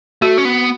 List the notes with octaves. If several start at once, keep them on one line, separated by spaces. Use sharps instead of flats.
A3 F#4
C#4
B3